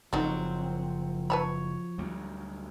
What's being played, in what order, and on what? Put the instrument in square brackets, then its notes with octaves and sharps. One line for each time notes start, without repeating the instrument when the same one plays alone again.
[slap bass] F#1 [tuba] F3 [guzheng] F#3 C4 [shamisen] D#4 A4
[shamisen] B4 A5 B5 [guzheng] C#5
[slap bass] D2 F#3 G3